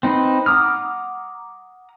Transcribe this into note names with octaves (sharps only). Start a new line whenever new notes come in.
C4 D#4 B4
F#5 A#5 D6 D#6 F6